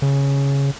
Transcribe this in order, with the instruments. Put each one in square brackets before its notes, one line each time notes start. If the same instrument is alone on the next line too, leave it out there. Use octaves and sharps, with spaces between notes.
[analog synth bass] C#3